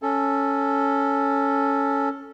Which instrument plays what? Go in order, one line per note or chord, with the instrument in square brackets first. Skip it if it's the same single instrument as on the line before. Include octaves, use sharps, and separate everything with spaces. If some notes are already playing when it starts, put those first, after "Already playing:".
[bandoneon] C#4 A4